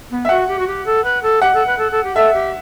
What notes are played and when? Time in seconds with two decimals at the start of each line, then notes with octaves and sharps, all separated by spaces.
0.10 B3
0.25 E5
0.29 F#4 F#5
0.48 G4
0.58 F#4
0.67 G4
0.86 A4
1.04 B4
1.22 A4
1.42 G4 F#5
1.54 A4
1.66 B4
1.78 A4
1.91 A4
2.03 G4
2.15 A4 E5
2.34 G4